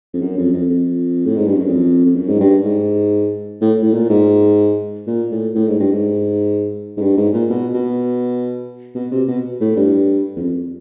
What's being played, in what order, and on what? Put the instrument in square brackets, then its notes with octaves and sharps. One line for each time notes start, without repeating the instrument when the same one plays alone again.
[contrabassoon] F2
F#2
F2
F2
F2
A2
G#2
G2
F#2
F2
F2
F#2
G#2
G2
G#2
A2
A2
A#2
G#2
A#2
A2
A2
G#2
G2
G#2
G#2
G2
G#2
A#2
B2
B2
B2
C3
B2
A2
G2
E2
F2